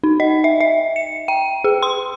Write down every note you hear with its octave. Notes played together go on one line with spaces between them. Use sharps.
D#4
D#5
E5
E5
C#7
G5
G#4
C6